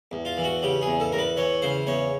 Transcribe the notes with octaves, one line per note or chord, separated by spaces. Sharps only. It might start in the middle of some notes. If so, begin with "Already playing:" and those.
E2
F4
E3
F#4
C#3 G4
G#4
E2
A4
E2 A#4
B4
E3 C#5
C#3 C5
E2 C#5